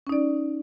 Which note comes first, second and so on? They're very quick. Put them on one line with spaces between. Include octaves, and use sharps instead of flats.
C#4 D#4 D5